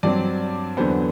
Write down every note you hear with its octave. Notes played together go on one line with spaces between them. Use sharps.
G2 F#3 C4 D5
E2 D3 F#3 B3 C5